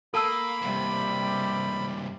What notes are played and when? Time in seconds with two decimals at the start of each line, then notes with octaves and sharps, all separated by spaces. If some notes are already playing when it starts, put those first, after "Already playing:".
0.14 A#3 A4 A5 B5 E6
0.62 G2 C3 G3 A#3